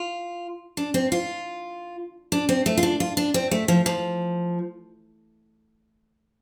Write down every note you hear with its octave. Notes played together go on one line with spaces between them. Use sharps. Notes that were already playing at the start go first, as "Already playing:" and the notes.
Already playing: F4
D4
C4
F4
D4
C4
A3
F4
D4
F4
D4
C4
A3
F3
F3